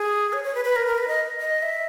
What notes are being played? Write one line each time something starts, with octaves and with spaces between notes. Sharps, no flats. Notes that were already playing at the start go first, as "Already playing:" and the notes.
Already playing: G#4
C#5
C#5
B4
B4
A#4
A#4
B4
D#5
D#5
E5